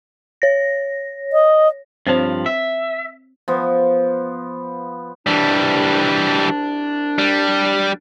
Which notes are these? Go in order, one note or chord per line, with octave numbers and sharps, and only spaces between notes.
C#5 A#6
D#5
G2 F3 C4 C5 C#5
E5
F3 B3
C2 E3 G3 D4
G3